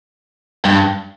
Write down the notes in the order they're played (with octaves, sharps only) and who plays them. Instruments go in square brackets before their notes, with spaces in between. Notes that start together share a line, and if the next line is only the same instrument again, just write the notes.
[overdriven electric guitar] G2